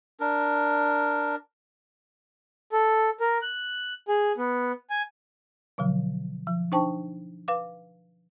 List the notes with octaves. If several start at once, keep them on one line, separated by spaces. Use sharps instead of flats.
D4 A#4
A4
A#4
F#6
G#4
B3
G#5
B2 D3 F3 F#3
F3
D4 D#4 C5 G5 A5 C#6
B4 F5 D6